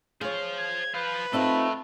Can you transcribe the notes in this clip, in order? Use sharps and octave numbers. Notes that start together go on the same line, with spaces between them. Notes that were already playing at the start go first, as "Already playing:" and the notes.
G#4 C5 C#5 F5
G#6
B4 C5 F5
A3 C4 D#4 F4 A4 B5